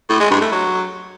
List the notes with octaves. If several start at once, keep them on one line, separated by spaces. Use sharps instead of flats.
A2
G#3
G2
A3
F#3